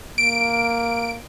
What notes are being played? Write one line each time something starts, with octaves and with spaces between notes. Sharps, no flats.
A#3 D7